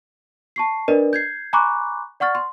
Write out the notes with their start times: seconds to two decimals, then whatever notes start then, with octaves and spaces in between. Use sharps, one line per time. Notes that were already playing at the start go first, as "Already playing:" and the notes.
0.56 A5 C#6 C7
0.88 D4 A#4 B4 D5 D#5
1.13 G6 G#6 C7
1.53 G#5 A#5 B5 C#6 D6 F#6
2.20 D5 F#5 C#6 F6 A6
2.35 C6